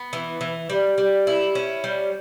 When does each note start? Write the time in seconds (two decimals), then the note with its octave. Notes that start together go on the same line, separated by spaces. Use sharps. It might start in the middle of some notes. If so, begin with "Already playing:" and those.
Already playing: B3
0.13 E3
0.41 E3
0.70 G3
0.98 G3
1.27 E4
1.55 C#4
1.84 G3